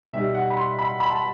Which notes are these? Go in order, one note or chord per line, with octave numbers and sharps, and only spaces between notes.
B2 G3 D#4 E5
F#5
B5
C6
B5
B5
A5